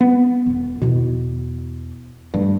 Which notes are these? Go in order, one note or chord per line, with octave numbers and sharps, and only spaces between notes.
B3
E1 B2
E2 B2 E4
G2 E3 A3